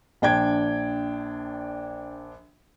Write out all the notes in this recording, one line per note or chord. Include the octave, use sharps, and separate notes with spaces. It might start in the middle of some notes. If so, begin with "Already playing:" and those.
A#1 D4 G5 G#6